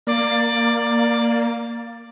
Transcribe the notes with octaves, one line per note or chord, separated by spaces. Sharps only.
A#3 D5